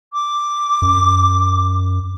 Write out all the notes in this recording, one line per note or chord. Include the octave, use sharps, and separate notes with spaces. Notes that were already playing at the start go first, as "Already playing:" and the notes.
D6
F#2